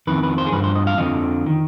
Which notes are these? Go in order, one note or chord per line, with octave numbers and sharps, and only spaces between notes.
F2 D#3 B4
B4
C5
G#4
G2 F3 B4
C5
D#5
F5
F2 D3 F3 D#5
D#3